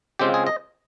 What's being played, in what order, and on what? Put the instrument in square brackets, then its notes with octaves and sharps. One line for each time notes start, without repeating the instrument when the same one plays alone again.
[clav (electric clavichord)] C#3 G#3 C4 F4 G4
G#4
D#5